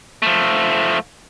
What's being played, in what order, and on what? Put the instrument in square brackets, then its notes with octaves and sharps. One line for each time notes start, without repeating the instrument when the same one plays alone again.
[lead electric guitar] F3 A3